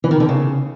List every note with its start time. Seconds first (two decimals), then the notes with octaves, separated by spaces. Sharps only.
0.04 E3
0.11 D#3
0.20 D3
0.29 C#3